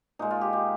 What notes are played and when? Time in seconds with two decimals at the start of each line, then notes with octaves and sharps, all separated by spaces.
0.19 A#2 G#3 D#4
0.31 F4
0.41 G4
0.53 G4